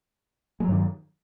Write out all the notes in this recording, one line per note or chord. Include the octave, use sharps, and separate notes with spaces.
G2 D#3 F#3 G#3